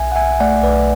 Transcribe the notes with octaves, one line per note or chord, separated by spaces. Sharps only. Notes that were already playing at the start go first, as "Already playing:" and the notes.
Already playing: B1 E5 G#5
F#5
B1 E5 G#5
A3 D5 F#5
B1 B4 D5